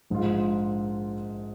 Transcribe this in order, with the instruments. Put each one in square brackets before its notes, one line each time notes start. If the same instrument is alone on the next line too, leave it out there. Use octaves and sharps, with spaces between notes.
[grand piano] A#1 G#2 G#3 F4